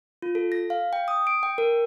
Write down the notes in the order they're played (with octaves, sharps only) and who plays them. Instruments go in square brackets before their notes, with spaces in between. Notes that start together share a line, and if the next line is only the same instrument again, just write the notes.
[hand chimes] F4
A4
A#6
F5
G5
D#6
D7
G5
A#4